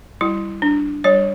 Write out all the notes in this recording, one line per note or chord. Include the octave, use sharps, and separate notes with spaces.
G3 E4
D4
G3 C#5